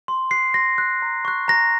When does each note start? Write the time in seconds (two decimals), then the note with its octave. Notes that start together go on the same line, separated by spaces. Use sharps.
0.08 C6
0.31 F#6 C7
0.54 C6 A#6
0.78 F#6
1.02 A#5
1.25 C#6 F#6
1.48 A#5 A#6